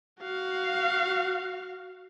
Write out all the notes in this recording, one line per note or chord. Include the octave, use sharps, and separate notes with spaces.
F#4 F5